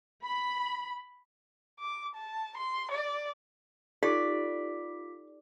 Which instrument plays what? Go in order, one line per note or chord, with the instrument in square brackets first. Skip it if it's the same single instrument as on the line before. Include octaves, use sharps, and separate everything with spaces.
[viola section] B5
[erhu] D6
A5
C6
D5
[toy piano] D#4 G4 A4 [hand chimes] F4 D6 B6 [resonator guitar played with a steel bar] D5